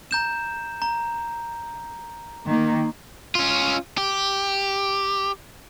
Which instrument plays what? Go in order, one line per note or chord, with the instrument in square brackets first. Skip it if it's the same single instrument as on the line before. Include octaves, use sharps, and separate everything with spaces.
[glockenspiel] A#5 G6 E7
A#5
[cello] D#3 A#3
[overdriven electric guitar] C#4 F4
G4